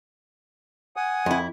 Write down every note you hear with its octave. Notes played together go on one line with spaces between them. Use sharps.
F#5 G#5 D#6
F2 E4